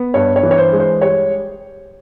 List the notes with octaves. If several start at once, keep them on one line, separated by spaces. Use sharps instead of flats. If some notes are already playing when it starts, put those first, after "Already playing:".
Already playing: B3
G2 C#5
C#5
E3
C#5
C5
G#3
C5
G3 C#5